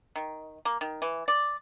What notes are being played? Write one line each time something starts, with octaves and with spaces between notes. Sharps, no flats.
D#3
A#3
D#3
E3
D5